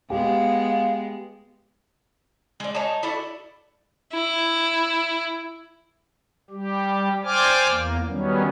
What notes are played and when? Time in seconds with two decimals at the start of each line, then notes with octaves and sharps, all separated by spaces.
0.10 G#3 B3 G4 F5
2.60 G#3 D5
2.75 D#4 C#5 A5
3.03 D4 E4 F#4 A4
4.14 E4
6.50 G3 G4
7.24 C5 D5 G5 G#5 D6 F6
7.69 E2 A#3
8.07 D#3 F#3 G3 B3 C#4